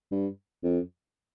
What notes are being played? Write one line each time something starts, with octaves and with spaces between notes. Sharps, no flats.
G2
F2